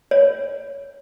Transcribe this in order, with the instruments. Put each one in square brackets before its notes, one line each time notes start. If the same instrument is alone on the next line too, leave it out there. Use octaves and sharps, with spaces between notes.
[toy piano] C#5